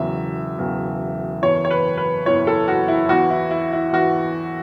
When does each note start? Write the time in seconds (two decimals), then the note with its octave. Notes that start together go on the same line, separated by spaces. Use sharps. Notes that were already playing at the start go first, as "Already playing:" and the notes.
Already playing: E1 E2 C#3 F#3 E5
0.58 E1 E2 C#3 F#3
1.42 F#1 E2 E3 C#5
1.65 C#5
1.71 B4
1.97 B4
2.26 F#1 E2 E3 C#5
2.47 A4
2.68 F#4
2.88 E4
3.09 E2 E3 F#4
3.30 E4
3.51 E4
3.73 E4
3.93 E3 F#4